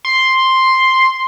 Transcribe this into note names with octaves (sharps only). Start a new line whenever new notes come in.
C6